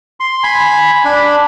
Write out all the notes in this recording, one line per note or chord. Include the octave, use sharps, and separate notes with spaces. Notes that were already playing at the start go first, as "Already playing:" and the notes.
C6
G#5 B5
D4 B5